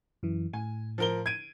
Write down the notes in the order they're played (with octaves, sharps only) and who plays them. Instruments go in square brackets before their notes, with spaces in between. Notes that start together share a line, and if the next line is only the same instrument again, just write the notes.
[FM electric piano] F#2 E3
[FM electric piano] A2 [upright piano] G#5
[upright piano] F3 A#4 G7
G#6 D7 D#7